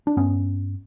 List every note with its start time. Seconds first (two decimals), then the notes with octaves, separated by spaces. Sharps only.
0.07 D4
0.17 G2 B3 C#4